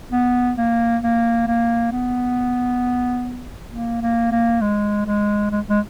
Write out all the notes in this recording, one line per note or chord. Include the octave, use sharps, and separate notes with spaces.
B3
A#3
A#3
A#3
B3
A#3
A#3
A#3
G#3
G#3
G#3
G#3